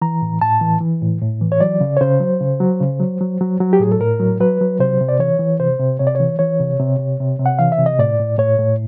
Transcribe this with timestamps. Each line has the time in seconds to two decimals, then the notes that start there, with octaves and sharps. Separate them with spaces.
0.02 E3 A#5
0.22 A2
0.41 A2 A5
0.61 E3
0.81 E3
1.02 A2
1.22 A2
1.41 E3
1.52 C#5
1.61 F#3 D5
1.81 C#3
1.97 C#5
2.01 C#3 C5
2.20 F#3
2.41 C#3
2.60 F#3
2.81 C#3
3.00 F#3
3.21 F#3
3.41 F#3
3.60 F#3
3.73 G4
3.80 A2 G#4
3.92 A4
4.00 A2 A#4
4.20 F#3
4.40 F#3 B4
4.61 F#3
4.79 C3 C5
5.00 C3
5.09 D5
5.19 E3 C#5
5.39 E3
5.60 C3 C5
5.79 C3
5.99 C3 C#5
6.07 D5
6.15 E3 C#5
6.39 E3 C#5
6.60 C3
6.80 C3
6.99 C3
7.20 C3
7.39 C3
7.46 F#5
7.59 E3 F5
7.72 E5
7.79 C3
7.86 D#5
7.99 A2 D5
8.20 A2
8.38 A2 C#5
8.59 A2